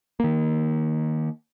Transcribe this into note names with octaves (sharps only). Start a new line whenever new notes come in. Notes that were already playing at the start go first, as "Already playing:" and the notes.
D#3 A#3